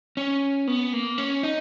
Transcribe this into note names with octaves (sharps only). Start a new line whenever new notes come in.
C#4
B3
A#3
C#4
D#4